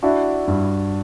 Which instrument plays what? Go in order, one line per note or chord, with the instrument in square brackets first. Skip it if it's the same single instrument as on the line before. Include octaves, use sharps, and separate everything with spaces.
[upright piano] D4 F#4 [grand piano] E4
[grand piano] G2